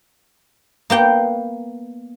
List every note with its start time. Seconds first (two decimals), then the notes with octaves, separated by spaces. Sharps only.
0.90 A#3 B3 G5